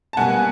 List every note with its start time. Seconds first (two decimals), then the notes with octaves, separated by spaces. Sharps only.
0.13 A5
0.17 B2 G3 A#3 F#5 G#5